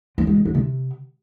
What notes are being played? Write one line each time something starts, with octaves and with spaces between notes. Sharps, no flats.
F3
G#3
C#3
D3
C3